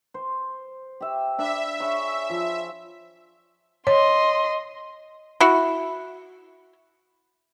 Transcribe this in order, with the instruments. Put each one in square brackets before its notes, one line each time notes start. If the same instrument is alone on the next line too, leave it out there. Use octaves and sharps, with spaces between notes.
[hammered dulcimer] C5
G4 E5
[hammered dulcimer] D4 F5 B5 [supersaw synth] E5
[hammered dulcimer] G#4 C#5 B5
F3
[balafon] C#5 [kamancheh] D#5 C6
[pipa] E4 F#4